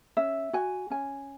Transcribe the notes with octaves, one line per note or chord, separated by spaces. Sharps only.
C#4 E5
F#4 G#5
C#4 G#5